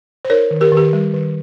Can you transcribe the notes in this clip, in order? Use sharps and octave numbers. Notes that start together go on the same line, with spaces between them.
C5
D#4 A#4 C#5
D#3
G4 A#4
D#3 G4
G3
D#3